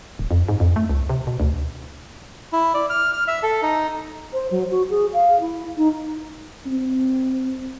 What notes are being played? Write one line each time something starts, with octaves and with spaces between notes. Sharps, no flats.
D1
F2
G#2
F2
A3
C#2
C3
B2
D2
E4
D5
F6
F6
E5
A4
D#4
C5
F#3
F#4
G#4
F5
E4
D#4
C4